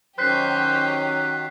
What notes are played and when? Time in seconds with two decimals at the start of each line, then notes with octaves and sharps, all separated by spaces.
0.18 D#3 F#3 C#4 G4 C5 F#6 B6 C7